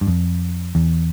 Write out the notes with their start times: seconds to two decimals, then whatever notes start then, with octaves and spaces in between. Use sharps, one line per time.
0.01 G2
0.07 F2
0.75 E2